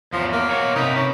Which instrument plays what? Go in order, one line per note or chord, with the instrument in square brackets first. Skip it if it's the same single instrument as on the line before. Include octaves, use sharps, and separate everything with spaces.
[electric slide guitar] E2 F#3 [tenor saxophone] F3
[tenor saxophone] A#3
[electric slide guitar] B2 C#5 F#5
[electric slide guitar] C3 B4 [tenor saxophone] D#4
[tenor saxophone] C#4